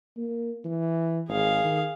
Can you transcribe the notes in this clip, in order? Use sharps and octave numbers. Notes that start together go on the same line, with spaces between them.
A#3
E3
G#1 G#4 F5
D#3